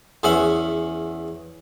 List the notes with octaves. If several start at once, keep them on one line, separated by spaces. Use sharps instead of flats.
E2 C#4 G#4 E5 F#5 B5